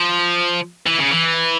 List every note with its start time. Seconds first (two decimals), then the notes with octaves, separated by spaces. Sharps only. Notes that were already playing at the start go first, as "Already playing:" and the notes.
Already playing: F3
0.87 E3
1.00 C#3
1.11 E3